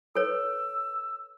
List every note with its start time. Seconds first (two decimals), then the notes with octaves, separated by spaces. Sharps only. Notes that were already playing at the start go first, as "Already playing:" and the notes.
0.15 A4 B4 C#5 E6